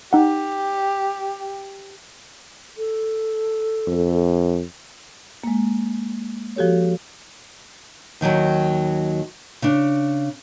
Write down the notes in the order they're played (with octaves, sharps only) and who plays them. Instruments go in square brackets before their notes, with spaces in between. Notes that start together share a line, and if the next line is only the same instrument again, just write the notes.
[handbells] D#4 F#5 [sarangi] G4
[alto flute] A4
[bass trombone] F2
[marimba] G#3 A#3
F3 F#4 G4 A4 C#5
[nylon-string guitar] D#2 D#3 F3 F#3
C#3 D4